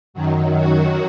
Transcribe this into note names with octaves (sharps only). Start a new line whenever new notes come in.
F#2 D#3 F#3
F#4